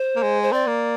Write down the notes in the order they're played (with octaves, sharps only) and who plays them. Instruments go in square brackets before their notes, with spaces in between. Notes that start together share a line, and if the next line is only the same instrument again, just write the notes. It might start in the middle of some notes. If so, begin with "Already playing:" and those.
Already playing: [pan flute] C5
[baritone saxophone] A#3
G#3
[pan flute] C5
[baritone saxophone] C4 [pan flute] D5
[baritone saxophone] A#3